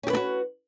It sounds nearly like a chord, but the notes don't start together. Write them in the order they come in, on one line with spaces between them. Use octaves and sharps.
C#4 G4 B4 B3 F#4